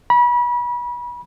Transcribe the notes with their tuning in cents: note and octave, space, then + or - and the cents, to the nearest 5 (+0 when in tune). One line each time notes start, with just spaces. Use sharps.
B5 -30